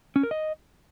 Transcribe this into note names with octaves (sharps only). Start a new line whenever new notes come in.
C#4
A#4
D#5